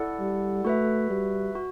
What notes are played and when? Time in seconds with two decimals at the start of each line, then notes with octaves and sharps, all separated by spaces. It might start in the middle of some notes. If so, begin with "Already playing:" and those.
Already playing: E4 A4 D5 F#5
0.20 G3
0.65 A3 F#4 B4 E5
1.10 G3
1.55 F#4